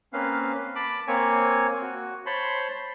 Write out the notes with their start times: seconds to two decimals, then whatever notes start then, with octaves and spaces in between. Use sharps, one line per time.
0.13 A#3 C4 C#4 B4 F5
0.76 A5 B5 D6
1.08 A#3 C4 C#5 G#5
1.82 F#4
2.26 C5 C#5 A5 B5 C6